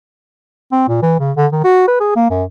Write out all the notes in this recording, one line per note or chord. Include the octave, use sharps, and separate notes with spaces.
C4
A#2
E3
C#3
D3
D#3
F#4
B4
G#4
A#3
F#2